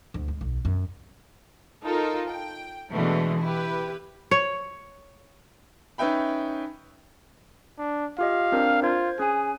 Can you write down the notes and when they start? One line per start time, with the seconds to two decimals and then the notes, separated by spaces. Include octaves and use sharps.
0.14 D2
0.28 G#3
0.41 B1
0.65 F#2
1.84 D#4 F4 A4 A#4
2.27 G5
2.91 B2 D3 E3 G#3 A3
3.43 E4 G4 B4
4.31 C#5
5.98 C#4 D#4 B4 E5 G5 B5
7.79 D4
8.18 F4 G4 D#5 F5
8.52 C4 D4 A#4
8.83 F4 C5 G#6
9.19 C#4 G#4 G#5